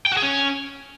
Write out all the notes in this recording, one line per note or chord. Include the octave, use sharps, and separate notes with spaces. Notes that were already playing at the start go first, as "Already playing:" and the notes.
G5
F#4
G#4
C#4